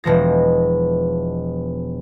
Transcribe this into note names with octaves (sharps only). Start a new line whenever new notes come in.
E1 B2 F3 A#6